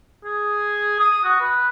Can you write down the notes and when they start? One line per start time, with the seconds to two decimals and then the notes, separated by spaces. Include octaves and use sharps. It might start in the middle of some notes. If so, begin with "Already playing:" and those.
0.25 G#4
1.00 D#6
1.24 F#4
1.40 B4